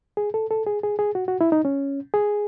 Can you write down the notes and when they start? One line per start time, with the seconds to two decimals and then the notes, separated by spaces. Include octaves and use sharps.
0.17 G#4
0.34 A4
0.51 A4
0.67 G#4
0.83 G#4
0.99 G#4
1.15 F#4
1.28 F#4
1.41 E4
1.52 D#4
1.65 C#4
2.14 G#4